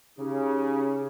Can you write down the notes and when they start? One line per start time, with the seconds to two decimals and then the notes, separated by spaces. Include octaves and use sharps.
0.18 C#3 D#4 G4 G#4